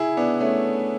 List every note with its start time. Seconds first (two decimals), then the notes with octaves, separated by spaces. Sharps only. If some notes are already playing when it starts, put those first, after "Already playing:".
Already playing: E4 G#4
0.17 B3 D4
0.40 A3 C#4